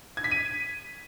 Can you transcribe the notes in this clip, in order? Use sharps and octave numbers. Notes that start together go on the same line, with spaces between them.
G#6
B6
D#7